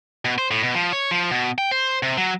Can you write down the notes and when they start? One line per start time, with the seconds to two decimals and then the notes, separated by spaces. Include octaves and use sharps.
0.25 B2
0.38 C5
0.51 A2
0.63 B2
0.75 F3
0.93 C#5
1.11 F3
1.31 B2
1.58 G5
1.71 C5
2.03 C3
2.17 F#3